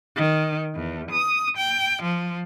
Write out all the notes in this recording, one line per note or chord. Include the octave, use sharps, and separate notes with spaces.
D#3
E2
D#6
G5
F3